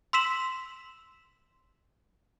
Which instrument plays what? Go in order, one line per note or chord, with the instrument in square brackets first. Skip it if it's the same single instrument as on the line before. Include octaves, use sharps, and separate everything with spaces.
[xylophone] C6 E6 B6 E7 F#7